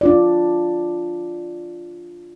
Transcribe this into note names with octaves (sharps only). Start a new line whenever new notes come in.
D4 F4 D5